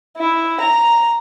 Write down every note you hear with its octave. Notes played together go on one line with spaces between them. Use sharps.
E4
A#5